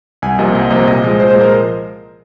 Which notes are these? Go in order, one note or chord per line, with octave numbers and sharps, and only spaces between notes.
C2 G#5
C3 F3 A#3 D#5
C2 D#5
C3 F3 A#3 D#5
A#2 D#5
F3 G#3
A#2 C5
C5
F3 G#3
A#4